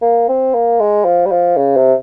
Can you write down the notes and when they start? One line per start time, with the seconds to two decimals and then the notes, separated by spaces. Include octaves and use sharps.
0.02 A#3
0.28 C4
0.54 A#3
0.80 G#3
1.05 F3
1.25 G3
1.31 F3
1.56 C#3
1.77 C3